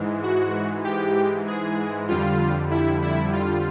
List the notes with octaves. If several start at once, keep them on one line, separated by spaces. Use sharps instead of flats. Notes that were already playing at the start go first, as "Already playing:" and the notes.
Already playing: G#2 E3 G#3
F#4
G4
G#4
F2 D3 G3 F4
E4
E4
F4